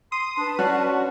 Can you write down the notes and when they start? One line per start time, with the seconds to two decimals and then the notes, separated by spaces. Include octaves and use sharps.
0.12 C6 D#6
0.37 D4 B4 A5
0.59 C#4 F#4 D5 F#5